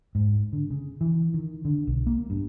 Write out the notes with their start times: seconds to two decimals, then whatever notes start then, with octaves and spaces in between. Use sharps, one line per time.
0.15 G#2
0.53 D3
0.70 C#3
1.01 E3
1.34 D#3
1.65 D3
1.87 B1
2.07 A#3
2.30 G2